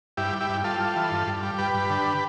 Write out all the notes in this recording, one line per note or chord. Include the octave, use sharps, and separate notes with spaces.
G2 E4 G4
G3
E4 G4
G2
G3 F4 A4
G3
E3
G2
G2
G3
G2 G4 B4
G2
D3